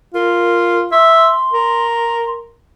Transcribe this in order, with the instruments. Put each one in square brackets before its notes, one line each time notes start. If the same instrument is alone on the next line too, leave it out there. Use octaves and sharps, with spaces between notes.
[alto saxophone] F4 [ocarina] A#4
[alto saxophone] E5 [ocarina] C6
[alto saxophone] A#4